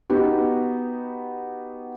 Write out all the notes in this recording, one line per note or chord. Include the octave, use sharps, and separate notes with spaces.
B3 D#4 F#4 G4